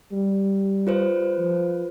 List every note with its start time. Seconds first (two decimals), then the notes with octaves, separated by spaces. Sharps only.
0.12 G3
0.87 F4 B4 C5
1.38 F3